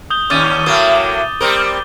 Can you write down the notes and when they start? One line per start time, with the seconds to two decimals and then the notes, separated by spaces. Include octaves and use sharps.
0.10 D#6 G6 G7
0.30 D#2 C#4 D6 A6 D#7
0.66 A2 F#3 A#3
1.41 G3 C4 A#4 G7